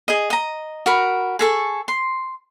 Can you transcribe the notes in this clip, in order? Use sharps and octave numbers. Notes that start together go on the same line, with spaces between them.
G#4 D#5
D#5 A#5
F#4 A#4 B5
G#4 A4 C#6
C6